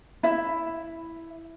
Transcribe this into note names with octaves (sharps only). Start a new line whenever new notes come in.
E4 E5